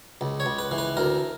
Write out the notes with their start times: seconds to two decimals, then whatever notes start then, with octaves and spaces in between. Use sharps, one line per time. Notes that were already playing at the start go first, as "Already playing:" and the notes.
0.21 C#2
0.40 C#5
0.46 C#2
0.59 B4
0.71 E3
0.78 B4
0.97 D2 A#4